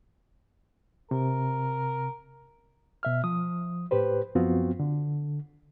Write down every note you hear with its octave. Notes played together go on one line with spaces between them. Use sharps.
C3 A#4
B2 E5 F6
F3 D#6
A2 G4 B4 C5
F#2 F3 B3 C4 F4 F#4
D3